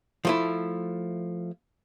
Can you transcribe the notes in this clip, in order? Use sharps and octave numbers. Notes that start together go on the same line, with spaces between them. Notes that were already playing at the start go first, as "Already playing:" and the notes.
F3 A3 E4